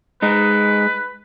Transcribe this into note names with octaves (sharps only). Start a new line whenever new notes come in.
G#3 D#4 B4